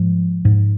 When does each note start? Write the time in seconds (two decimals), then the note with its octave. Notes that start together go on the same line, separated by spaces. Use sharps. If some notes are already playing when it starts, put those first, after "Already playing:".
Already playing: G#2 F3
0.45 G#2